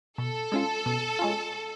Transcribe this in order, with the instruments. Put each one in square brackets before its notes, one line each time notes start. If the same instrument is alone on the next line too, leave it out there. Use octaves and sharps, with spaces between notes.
[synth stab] B2 [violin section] A4
[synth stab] G#3 C#4 F4
B2
G#3 C#4 F4